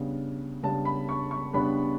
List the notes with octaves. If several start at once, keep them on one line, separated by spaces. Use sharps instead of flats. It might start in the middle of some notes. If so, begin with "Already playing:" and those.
Already playing: C#3 G3 B3 D4
C#3 G3 B3 D4 A5
B5
C#6
C#6
C#3 G3 B3 D4 B5